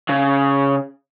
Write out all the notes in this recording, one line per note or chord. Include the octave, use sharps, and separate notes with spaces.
C#3